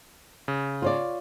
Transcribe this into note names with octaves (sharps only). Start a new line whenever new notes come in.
C#3
F4 C#5 D5